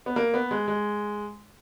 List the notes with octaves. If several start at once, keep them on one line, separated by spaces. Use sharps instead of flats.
B3
A#3
B3
G#3
G#3